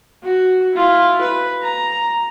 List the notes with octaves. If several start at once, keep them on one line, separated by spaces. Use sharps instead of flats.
F#4
E4 F4
B4
A#5